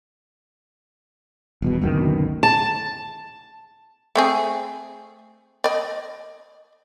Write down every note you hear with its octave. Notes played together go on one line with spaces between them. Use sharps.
D#1 E2 B2
F#1 D2 B2 D#3
A5
A3 C4 G#4
D5 D#5